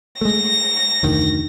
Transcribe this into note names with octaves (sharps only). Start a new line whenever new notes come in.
G#3 A3 A#6
F1 D2 D#3